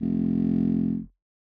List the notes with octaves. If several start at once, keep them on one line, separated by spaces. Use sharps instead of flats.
F1